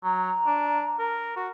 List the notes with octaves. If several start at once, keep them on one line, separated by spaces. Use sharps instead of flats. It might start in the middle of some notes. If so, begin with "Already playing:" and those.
F#3 A#5
D4
A#4
F#4